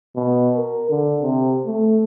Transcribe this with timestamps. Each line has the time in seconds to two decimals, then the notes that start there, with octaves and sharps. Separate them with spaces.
0.16 B2
0.56 A#4
0.89 D3
1.22 C3
1.66 A3